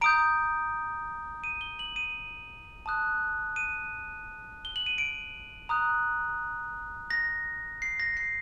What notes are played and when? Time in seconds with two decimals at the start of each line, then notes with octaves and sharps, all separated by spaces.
0.01 A#5 D#6 G6 D7
1.44 D#7
1.61 G7
1.79 F#7
1.96 D#7
2.86 A5 D#6 F#6
3.56 D#7
4.65 G7
4.76 F#7
4.86 D#7
4.98 D7
5.69 A#5 D#6 F#6
7.10 A#6
7.82 C7
8.00 A#6
8.17 C7